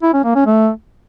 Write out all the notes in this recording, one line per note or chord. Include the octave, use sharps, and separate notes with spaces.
E4
C#4
A#3
C#4
A3